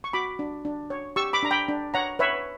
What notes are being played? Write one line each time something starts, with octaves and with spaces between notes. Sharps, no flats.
C#6
F#4 B5 D6
D4
D4
C#5
G4 C#6 E6
B5 D6
D4 A#5
G5 B5
D4
C#5 F#5 A#5
B4 C#5 E5